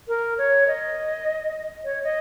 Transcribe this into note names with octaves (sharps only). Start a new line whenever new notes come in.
A#4
C#5
D#5
C#5
D#5